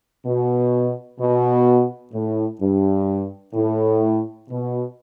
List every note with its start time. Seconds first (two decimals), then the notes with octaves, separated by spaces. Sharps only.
0.24 B2
1.19 B2
2.13 A2
2.60 G2
3.54 A2
4.49 B2